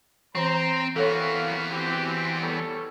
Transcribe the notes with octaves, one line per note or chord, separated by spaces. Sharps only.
E3 C4 C5 A#5
E3 B3 C4 F#4 A4 A#4 C#5 F5
C4 F#4 G4
G3 A4 C#5